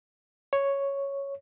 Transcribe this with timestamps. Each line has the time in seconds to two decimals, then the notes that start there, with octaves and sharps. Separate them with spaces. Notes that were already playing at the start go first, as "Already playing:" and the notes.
0.53 C#5